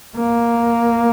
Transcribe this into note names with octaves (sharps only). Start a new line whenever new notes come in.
A#3